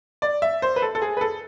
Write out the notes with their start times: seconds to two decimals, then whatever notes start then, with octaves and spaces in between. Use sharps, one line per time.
0.22 D5
0.42 E5
0.62 C5
0.76 B4
0.82 A4
0.95 A4
1.02 G#4
1.17 B4
1.21 A4